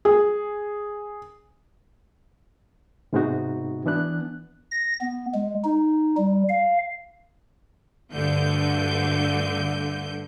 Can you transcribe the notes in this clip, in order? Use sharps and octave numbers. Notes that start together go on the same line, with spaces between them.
G#4
G#2 C3 G#3 B3 D#4 F#4
E3 B3 D4 F#6
A#6
B3
G#3
D#4
G3
F5
D2 G2 D3 G6